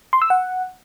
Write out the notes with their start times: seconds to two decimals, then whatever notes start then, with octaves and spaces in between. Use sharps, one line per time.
0.13 C6
0.22 E6
0.30 F#5